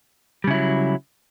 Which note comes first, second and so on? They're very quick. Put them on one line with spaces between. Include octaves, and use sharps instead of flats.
G3 C#3 E4 F#3